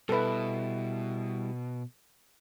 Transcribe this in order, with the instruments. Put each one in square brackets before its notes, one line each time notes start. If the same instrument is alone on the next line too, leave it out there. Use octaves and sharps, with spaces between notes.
[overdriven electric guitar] B2 [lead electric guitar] G3 E4 [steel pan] A4 B4